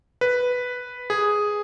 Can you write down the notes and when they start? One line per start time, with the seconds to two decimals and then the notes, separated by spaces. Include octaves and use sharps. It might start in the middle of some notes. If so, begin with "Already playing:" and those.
0.21 B4
1.10 G#4